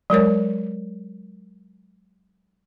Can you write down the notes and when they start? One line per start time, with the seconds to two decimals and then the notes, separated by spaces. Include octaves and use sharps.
0.10 F#3 G#3 A#4 C#5